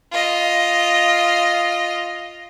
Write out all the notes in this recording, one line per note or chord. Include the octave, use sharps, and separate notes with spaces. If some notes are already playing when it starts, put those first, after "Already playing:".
F4 D#5